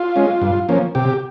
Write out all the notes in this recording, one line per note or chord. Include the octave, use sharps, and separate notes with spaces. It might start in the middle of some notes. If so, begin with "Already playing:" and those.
Already playing: F4
G#3 C#4
G2
F3 A#3 C#4
C3 G4